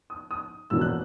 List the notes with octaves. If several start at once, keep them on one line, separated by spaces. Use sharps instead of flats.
D#6
D#6
E1 E2 B2 A#3 E6
F#6